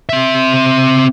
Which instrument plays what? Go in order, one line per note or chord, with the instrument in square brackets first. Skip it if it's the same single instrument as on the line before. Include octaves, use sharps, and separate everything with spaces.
[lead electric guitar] C4 E5